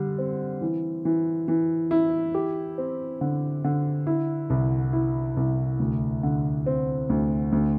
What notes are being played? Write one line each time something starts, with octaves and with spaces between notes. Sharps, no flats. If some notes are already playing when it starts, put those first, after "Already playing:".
Already playing: D3 G3
C4
E3
E3
E3
E4
G4
C4
D3
D3
E4
C2
E4
C2
D2
D3
C4
D2
D2